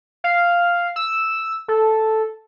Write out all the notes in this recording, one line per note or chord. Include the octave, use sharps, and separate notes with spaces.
F5
E6
A4